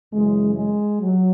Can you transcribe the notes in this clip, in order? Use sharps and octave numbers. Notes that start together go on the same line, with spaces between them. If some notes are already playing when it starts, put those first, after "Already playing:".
F#2 C#3 E3 G#3
G#3
F#3